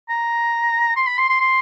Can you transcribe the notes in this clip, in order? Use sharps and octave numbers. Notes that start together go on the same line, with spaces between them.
A#5
C6
B5
C6
C6
C6